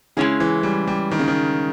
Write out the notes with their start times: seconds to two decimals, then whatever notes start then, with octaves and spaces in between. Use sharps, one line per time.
0.17 C#3 G#3 C#4 E4 G#4
0.40 E3
0.63 G3
0.88 G3
1.11 D#3
1.19 C#3
1.28 D#3